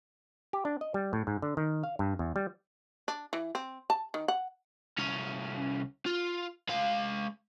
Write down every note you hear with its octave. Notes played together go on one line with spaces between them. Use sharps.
G4
D4
D#5
G3
A2
G#2
D3
D#3
F5
G2
E2
G3
D4
E3
C4
A5
D#3
F#5
C2 C#4
F4
G#3 F5